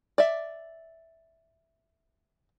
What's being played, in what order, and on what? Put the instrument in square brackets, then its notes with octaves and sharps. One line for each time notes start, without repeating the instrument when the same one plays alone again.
[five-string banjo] D5 E5